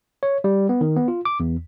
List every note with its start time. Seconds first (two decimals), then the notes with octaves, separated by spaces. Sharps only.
0.23 C#5
0.44 G3
0.69 B3
0.81 D#3
0.96 B3
1.08 F4
1.25 D6
1.40 E2